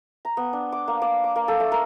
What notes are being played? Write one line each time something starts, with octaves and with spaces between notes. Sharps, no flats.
A#5
B3
D4
D6
A#3
D5
D6
A#3
A4
A3
A#4